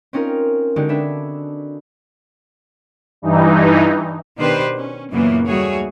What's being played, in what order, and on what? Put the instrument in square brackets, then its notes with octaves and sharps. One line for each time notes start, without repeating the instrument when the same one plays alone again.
[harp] C4 C#4 D#4 F4 A#4
D3 G#3 D#4 F#4 G4
D4 G#4 B4 E5
[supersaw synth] G2 E3 D#4
[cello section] B2 D#3 D4 G4 B4 C5
C#4
F#2 A#2 C#3 E3 A#3 B3
D#2 G3 A3 F#4 G#4 C#5